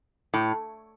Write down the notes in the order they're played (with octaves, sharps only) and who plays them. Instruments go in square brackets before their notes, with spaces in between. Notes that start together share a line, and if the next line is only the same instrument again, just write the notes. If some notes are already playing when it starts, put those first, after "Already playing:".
[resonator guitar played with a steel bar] A2